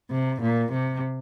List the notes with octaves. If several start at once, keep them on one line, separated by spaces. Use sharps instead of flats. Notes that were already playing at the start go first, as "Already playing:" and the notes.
C3
A#2
C3